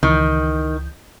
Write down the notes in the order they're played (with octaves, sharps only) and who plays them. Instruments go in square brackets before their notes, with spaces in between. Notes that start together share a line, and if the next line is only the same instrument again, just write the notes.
[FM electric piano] C#2 E3 G6 [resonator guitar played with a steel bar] D#3